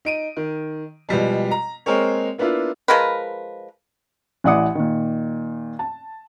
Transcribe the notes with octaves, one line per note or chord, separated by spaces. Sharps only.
D#4 D7 D#7
D#3
B2 F3 G3 G#3
A#5
G#3 A#3 C4 G#4 A#4 C#5
A#3 B3 D4 E4 F4
F3 G#3 A#4 B4
A1 E3 D5 F#5 D#6 C#7
A#2 D#3
A5